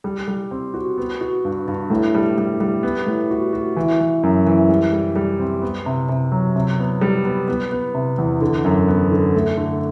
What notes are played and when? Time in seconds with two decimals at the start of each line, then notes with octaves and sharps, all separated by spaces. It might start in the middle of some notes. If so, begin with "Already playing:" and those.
0.04 G3
0.28 G3
0.51 C4
0.74 F#4
0.98 B3
1.21 F#4
1.45 G2
1.68 G2
1.90 A2
2.14 G3
2.38 G3
2.60 G3
2.83 B3
3.07 A2
3.31 F#4
3.53 F#4
3.77 E3
4.00 E3
4.23 F#2
4.46 E3
4.69 G3
4.93 G3
5.16 G3
5.39 C4
5.62 B3
5.86 C3
6.09 C3
6.32 F#3
6.56 C3
6.79 B3
7.01 G3
7.25 B3
7.48 B3
7.72 B3
7.94 C3
8.18 E2
8.41 D3
8.64 F#2
8.88 B3
9.11 D3
9.34 A3
9.57 D3